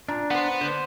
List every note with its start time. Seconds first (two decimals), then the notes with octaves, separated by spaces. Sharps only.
0.08 A#2 D4
0.31 B3 C5 F#5
0.61 D3 C5